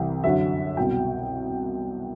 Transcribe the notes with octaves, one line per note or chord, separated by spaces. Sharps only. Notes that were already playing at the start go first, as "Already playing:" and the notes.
Already playing: C2 C3 E3 G5
F#2 D3 F#3 E5
C2 B2 F#3 G5